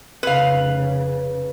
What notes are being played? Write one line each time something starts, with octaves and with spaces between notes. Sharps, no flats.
F1 C#3 B4 F5